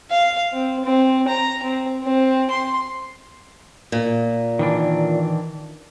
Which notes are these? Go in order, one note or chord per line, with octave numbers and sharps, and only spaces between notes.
F5
C4
C4
A#5
C4
C4
C6
A#2
D#3 E3 D4